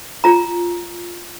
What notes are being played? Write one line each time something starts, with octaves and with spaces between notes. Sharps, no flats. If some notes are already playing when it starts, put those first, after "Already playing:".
F4 A#5